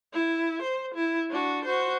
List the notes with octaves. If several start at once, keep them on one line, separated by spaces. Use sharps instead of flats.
E4
C5
E4
D4 F#4
F#4 C5